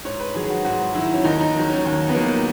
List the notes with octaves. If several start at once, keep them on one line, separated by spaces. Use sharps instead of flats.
G#2 C#5
B4
D#3 F#3 G#4
F#4
G#2 F#4
D#3 F#3 E4
C#4
D#2 D#4
D#4
D#3 F#3
C#4
D#2
B3
D#3 F#3 A#3